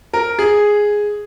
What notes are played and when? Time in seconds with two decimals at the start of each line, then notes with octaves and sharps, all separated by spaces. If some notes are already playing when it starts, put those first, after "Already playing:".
0.14 A#4
0.39 G#4